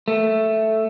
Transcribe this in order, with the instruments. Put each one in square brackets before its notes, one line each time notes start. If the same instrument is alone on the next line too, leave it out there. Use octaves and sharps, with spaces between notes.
[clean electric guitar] A3